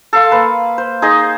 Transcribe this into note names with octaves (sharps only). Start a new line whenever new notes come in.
A4 F5 C6
A#3 B4
C5
D#4 G#4 C5 D#5